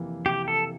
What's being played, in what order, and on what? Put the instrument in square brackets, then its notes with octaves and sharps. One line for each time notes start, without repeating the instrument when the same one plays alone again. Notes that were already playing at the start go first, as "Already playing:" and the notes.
Already playing: [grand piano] F2 C3 E3 A#3
[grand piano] C3 [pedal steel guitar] G4
[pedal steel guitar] A4